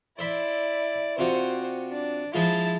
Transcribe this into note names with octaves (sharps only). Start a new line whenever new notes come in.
E4 C5 D5 E5 B5
C3 F4 F#4 C5
D4
F3 G#3 E4 F4 A5